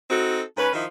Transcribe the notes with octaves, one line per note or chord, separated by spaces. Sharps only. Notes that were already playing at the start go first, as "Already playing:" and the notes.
C4 D#4 F#4 A4
G#2 C#4 B4
D#3 F3 D#4 E4